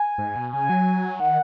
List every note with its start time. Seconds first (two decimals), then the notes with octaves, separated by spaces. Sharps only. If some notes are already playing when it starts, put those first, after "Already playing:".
Already playing: G#5
0.18 G#2
0.36 B2
0.52 C#3 G#5
0.70 F#3
1.20 D#3 F#5